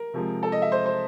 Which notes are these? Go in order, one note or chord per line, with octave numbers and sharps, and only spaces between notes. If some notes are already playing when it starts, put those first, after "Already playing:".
Already playing: A#4
C3 F3 G#3
A4
D#5
E5
C5
C5